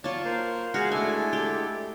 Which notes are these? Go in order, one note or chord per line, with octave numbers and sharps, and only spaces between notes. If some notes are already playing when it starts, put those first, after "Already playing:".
F#3 F4 C#5 D5 A5
A#3 C5
G#3 F#4 G#4 F5 F6
A3 D4 E4 A4 G#5
G4